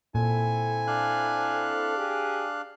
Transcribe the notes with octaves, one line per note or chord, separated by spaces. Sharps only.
A#2 C4 E4 A4 G#5
D4 F5 F#6
G4 G#4